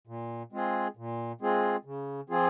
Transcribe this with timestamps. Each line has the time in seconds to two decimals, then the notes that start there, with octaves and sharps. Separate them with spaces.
0.07 A#2
0.52 G#3 C4 F4 G#4
0.97 A#2
1.41 G#3 C4 F4 G#4
1.85 C#3
2.29 F3 C4 F4 G#4